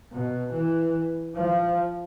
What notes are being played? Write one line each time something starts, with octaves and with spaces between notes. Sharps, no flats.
B2
E3
F3